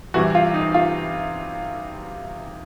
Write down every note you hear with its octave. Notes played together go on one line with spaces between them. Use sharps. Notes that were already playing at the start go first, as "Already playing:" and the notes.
C3 E3 G3 F#4
F4
D#4
F4